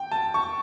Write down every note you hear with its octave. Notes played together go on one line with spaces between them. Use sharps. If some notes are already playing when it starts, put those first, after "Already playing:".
Already playing: G5
A5
C#6